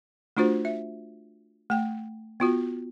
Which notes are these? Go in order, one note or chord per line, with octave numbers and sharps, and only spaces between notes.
A3 D4 F4 F#4 C5
E5
A3 G5
B3 F4 F#4